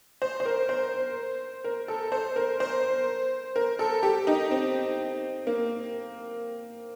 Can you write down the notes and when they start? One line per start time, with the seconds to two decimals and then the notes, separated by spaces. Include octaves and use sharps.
0.22 C5
0.40 C5
0.46 A#4
0.69 C5
1.64 A#4
1.88 A4
2.12 C5
2.36 A#4
2.60 C5
3.56 A#4
3.79 A4
4.03 G4
4.27 D#4
4.51 C4
5.47 A#3